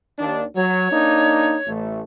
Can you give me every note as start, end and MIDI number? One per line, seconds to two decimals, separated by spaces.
0.19 0.45 39
0.19 0.45 62
0.55 0.89 54
0.55 1.71 73
0.91 1.57 58
0.91 1.57 62
0.91 1.57 63
1.67 2.01 33
1.67 2.01 57